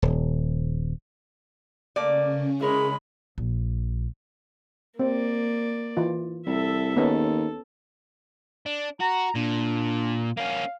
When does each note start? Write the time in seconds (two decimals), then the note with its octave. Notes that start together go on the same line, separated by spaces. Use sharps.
0.02 D#1
1.96 C#3 A3 A#3 C#4 D5
2.61 G#3 E4 G#4 A#4 C#5 B5
3.38 A#1
5.00 A#3 C4 D5
5.97 E3 F4
6.46 C2 A4 E5
6.96 D#2 B3 C#4 D#4 A4
8.66 D4
9.01 F#4 A#5
9.36 A#2 D4
10.37 A#3 C#4 F5